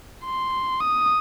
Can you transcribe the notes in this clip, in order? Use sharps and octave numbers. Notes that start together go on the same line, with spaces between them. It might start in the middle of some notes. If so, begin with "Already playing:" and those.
C6
D#6